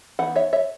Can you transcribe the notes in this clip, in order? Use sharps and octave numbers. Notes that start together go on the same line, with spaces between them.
E3 B3 D#4 F#5
C#5 E5
C#5 E5